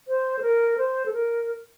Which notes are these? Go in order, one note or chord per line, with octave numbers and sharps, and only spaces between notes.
C5
A4
A#4
C5
A4
A#4